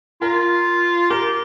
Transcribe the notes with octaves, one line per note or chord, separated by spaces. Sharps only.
F4 A#4
G4 A#4